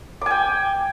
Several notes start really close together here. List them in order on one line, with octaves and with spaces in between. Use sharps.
D6 G#5 G5